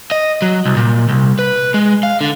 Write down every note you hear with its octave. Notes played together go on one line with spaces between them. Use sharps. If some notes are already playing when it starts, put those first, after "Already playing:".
D#5
F#3
C2
A#2
C2
B4
G#3
F5
D3